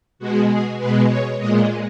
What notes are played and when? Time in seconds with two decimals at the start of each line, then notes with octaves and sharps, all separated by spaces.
0.19 B2 G#3 F#4
0.49 G#4
0.78 B2 G#3 B4
1.08 C#5
1.38 A#2 G#3 D#5